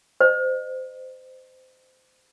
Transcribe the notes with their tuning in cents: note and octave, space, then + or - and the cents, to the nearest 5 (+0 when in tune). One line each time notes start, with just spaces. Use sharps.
C5 -20 D#5 -30